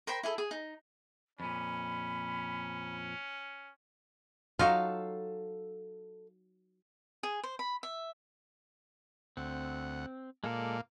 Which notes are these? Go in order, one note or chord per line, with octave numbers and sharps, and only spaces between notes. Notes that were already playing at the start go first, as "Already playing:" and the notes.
A#4 C5 G5 B5
E4 G#4 A4
G#4
D#4
F2 A#2 C#4 B5
F#3 D#4 F4 A4 F5
G#4
C5
B5
E5
D2 C4 F#5
A#2 G#3 A#3 A4 D5